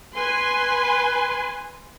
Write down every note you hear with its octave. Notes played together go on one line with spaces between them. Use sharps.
B4 G#5 C6